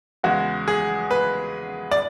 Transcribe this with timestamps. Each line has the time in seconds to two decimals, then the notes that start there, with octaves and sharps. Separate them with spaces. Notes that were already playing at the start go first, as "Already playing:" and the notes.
0.23 E2 C#3 G#3 F#4
0.68 G#4
1.11 B4
1.91 D5